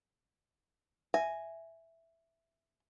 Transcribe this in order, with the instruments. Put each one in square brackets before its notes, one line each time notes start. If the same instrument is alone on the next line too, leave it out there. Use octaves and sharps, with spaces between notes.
[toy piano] E5 [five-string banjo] G#5